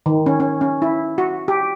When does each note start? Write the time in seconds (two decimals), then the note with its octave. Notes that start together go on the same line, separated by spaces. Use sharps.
0.06 D#3
0.26 C#4
0.40 C#4
0.61 C#4
0.82 E4
1.18 F#4
1.48 G4